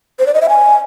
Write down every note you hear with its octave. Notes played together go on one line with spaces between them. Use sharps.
C5
D5
D#5
E5
G#5